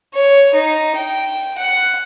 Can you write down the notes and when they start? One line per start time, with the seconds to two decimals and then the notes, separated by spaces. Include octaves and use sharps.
0.14 C#5
0.55 D#4
0.96 G5
1.59 F#5